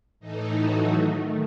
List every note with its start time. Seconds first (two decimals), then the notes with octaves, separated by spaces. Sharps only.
0.20 A2 E3 A3 D#4
0.56 F#3 F#4
0.94 D#3 A3